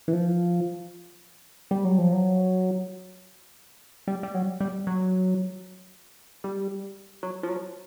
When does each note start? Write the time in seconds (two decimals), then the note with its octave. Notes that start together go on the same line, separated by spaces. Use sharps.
0.08 E3
0.13 F3
1.71 G3
1.85 F#3
1.98 F3
2.12 F#3
4.08 G3
4.23 G3
4.34 F#3
4.60 G3
4.87 F#3
6.44 G3
7.23 F#3
7.43 F3
7.49 F#3